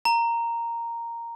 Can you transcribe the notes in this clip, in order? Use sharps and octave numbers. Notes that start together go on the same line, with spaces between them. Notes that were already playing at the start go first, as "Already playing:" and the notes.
A#5